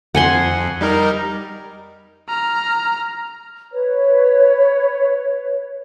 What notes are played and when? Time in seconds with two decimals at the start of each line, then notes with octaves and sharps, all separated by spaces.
0.15 F2 F#5 G#5 C6
0.81 G3 D#4 A#4
2.28 A#5 F6
3.73 B4 C#5